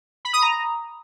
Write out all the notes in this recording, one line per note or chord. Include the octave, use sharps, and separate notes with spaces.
B5
D#6
A#5